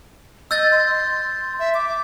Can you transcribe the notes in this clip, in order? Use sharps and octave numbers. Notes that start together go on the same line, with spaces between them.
D#5 E6 G6 A6
C6
E5
D6